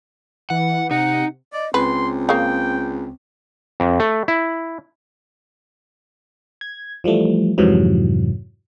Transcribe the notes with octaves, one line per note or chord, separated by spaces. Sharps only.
E3 F#5
C3 D#4 F#5
D5 D#5
C#2 C4 B4 C6
C#3 A#3 G5
F2
A3
E4
G#6
E3 F3 G3 A3
F2 G#2 C3 E3 F#3